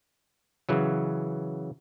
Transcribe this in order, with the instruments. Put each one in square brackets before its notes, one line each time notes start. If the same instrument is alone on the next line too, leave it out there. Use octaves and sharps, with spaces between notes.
[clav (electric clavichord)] C#3 E3 F#3